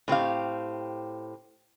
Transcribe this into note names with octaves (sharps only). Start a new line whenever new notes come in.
A2 C4 G4 F5